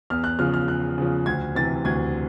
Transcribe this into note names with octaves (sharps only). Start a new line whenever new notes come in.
E2 F6
F#6
C#3 F3 F6
F6
E2 F#6
C#3 F3
D2 G#6
C3 E3 A6
D2 G#6